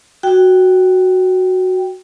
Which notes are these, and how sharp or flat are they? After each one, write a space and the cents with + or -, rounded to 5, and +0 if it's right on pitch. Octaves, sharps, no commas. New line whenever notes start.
F#4 +0 G5 +0